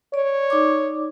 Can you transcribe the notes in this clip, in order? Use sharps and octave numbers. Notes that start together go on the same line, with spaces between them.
C#5 D5
D#4 D5 D6